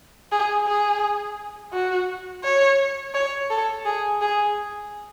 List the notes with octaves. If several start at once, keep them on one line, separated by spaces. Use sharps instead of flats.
G#4
G#4
F#4
C#5
C#5
A4
G#4
G#4